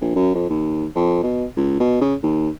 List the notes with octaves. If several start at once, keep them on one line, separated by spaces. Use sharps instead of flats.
A#1
F#2
F2
D#2
F2
B2
C#2
B2
C#3
D#2